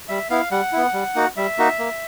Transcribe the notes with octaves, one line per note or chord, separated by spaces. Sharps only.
G3 E5
B3 E4 F5
G3 F#5
B3 E4
G3
A#3 D#4 F#4
G3 E5
A#3 D#4 F#4
A#3